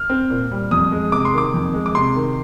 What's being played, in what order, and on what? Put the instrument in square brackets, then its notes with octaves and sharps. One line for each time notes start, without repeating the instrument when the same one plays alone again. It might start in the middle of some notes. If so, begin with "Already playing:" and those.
Already playing: [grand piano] F6
C4
A#2
G3
F2 D#6
G#3
C3 D6
C6
D#3 D6
F2
G#3
D6
C3 C6
D#3